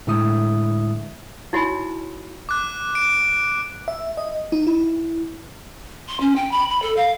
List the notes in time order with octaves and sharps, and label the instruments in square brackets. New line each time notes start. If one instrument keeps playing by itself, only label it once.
[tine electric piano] A2 D3 G#3 E4 E5 D#6
[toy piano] D#4 E4 F#4 C#5 G#5 B5
[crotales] D6 F#6
D7
[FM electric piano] E5
D#5
D#4
E4
[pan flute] C6
C#4
G5
B5
B5
A4
F5